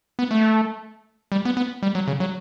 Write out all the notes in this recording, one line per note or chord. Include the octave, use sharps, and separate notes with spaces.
B3
A3
G3
B3
B3
G3
F#3
C#3
F#3